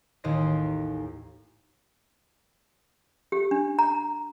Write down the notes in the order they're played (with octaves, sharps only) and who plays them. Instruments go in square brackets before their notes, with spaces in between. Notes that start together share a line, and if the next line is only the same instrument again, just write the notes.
[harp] A1 D#2 D#3 D#5 C6 A#6
[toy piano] G4
D4
A#5